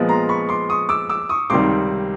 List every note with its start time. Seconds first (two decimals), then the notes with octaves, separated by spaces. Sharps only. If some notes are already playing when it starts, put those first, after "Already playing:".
Already playing: A#2 F3 G#3 B3
0.09 A#5 C6
0.29 B5 C#6
0.49 C6 D6
0.70 C#6 D#6
0.89 D6 E6
1.09 D6 E6
1.29 C#6 D#6
1.50 C#2 C3 D#3 G3 C6 D6